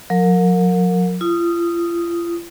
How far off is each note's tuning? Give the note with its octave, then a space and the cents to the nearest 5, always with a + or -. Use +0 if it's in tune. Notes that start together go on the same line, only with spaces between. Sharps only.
F#3 -45 A#4 -20
F4 -40 D#6 +0